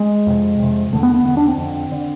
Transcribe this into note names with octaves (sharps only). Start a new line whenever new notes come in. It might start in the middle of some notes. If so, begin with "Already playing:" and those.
Already playing: G#3
F2 C3
F2 C3
E2 D3 A3
B3
B3
E2 D3 B3
D4
C4
F2 D3
D3